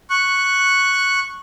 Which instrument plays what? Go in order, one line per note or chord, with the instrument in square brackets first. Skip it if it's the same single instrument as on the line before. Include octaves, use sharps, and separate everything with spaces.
[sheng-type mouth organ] C#6 F#6